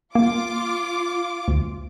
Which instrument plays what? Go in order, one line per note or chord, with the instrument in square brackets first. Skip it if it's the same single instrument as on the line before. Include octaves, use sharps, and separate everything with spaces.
[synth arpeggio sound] A#3 [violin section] F4 D6
[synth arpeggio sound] D2